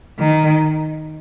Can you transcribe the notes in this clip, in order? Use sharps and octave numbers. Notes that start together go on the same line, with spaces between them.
D#3